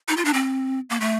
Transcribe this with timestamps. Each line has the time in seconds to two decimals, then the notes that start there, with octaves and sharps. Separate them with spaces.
0.08 D#4
0.17 F4
0.25 D4
0.34 C4
0.90 A#3
1.00 A3